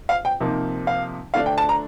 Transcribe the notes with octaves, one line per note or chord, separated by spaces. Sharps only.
F5
G5
C3 F3 A#3 D#4
F5
D3 A3 D4 F5
G5
A5
A#5